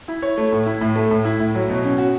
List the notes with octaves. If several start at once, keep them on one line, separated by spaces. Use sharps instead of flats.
E4
C#5
A3
A2
E4
A2
A3
A2
E4
A2
F#3
B2
C#4
F#4